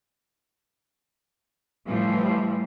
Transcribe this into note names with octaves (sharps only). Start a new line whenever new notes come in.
A2 E3 F3 G3